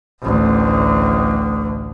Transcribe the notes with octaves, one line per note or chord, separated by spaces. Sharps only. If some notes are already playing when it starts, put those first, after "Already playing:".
A1 D2